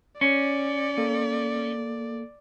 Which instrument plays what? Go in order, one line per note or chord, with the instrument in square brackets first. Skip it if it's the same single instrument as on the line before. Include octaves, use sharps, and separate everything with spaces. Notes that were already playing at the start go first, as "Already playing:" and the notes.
[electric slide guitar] C#4 [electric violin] D5
[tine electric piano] A#3 A4